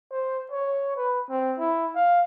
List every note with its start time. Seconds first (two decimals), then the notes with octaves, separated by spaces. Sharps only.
0.12 C5
0.52 C#5
0.97 B4
1.30 C4
1.59 E4
1.95 F5